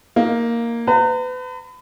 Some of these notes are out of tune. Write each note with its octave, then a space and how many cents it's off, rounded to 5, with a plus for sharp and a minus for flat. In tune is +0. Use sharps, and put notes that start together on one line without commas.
A#3 +0 D#4 +25
B4 +35 A#5 -35